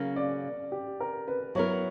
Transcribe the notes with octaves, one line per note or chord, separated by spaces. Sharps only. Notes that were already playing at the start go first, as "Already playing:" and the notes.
Already playing: C#3 F#3 A#3
D5
G4
A#4
B4
F#3 B3 E4 A#4 C#5